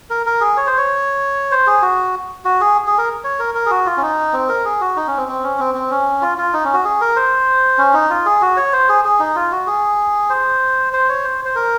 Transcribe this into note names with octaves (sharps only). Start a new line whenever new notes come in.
A#4
A#4
G#4
C#5
C5
C#5
C5
G#4
F#4
F#4
G#4
G#4
A#4
C#5
A#4
A#4
G#4
F#4
F4
C#4
D#4
C4
A#4
G#4
F#4
D#4
C#4
C4
C4
C#4
C4
C4
C#4
F4
F4
D#4
C#4
F#4
G#4
A#4
C5
C#4
D#4
F4
G#4
F#4
C#5
C5
G#4
G#4
D#4
F4
F#4
G#4
C5
C5
C#5
C5
C5
A#4